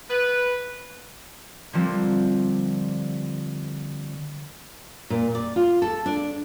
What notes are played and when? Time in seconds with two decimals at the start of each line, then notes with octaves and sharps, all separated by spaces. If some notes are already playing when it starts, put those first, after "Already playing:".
0.10 B4
1.73 D3 F3 G3 A#3 C4
5.10 A#2
5.35 D5
5.56 F4
5.82 A4
6.06 D4